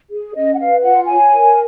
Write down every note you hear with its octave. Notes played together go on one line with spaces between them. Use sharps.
G#4
C#4 D#5
F#5
B4 F5
F4 F#5
C#5 G#5
A#4